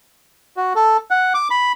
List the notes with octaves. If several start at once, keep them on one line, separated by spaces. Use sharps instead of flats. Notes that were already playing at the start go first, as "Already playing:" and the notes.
F#4
A4
F#5
D6
B5